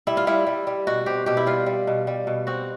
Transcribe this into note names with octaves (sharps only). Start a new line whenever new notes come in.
G3 E4
F4
G3 E4
G3
G3
B2 F#4
C4 G4
B2 G4
E4
G3 F4
G3
B2
G3
B2
C4 F#4